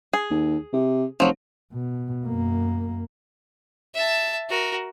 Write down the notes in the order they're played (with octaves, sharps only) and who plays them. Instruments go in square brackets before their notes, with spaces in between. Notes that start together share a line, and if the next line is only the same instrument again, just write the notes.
[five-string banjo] G#4
[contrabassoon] D#2
C3
[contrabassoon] F1 [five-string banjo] F3 F#3
[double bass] B2
F#2 A#3
[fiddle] E5 A5
F#4 A#4